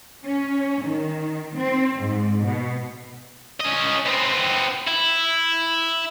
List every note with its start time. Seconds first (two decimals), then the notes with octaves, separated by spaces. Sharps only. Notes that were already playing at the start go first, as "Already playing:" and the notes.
0.24 C#4
0.84 D#3
1.57 C4
1.98 G#2
2.45 B2
3.60 C#4 D#5
4.06 B3 C4
4.87 E4